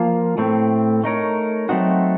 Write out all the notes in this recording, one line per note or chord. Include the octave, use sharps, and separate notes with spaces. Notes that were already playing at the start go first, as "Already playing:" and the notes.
Already playing: F3 A#3 F4
A2 A3 C4
A3 D#4 A#4 C#5
F#3 A3 C4 D#4 F#4